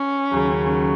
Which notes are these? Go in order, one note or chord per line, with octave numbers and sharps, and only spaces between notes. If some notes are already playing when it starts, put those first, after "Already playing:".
Already playing: C#4
D#2 C#3 F#3